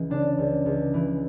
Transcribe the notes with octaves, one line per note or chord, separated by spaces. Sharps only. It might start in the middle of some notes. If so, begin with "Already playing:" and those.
Already playing: C#2 E3
C#3 D4
C#2
C#2
E3